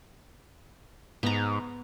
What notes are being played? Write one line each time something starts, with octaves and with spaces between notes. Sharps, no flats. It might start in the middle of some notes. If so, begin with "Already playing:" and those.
G#2 B3 A#5